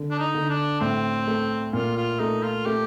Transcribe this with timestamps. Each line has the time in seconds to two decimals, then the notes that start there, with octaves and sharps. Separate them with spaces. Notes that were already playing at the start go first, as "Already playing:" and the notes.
Already playing: D3
0.11 D4
0.19 D#4
0.35 D3
0.50 D4
0.81 A2 C4
1.27 A3
1.73 A#2 F4
1.97 F4
2.20 A3 D#4
2.43 F4
2.65 A3 G4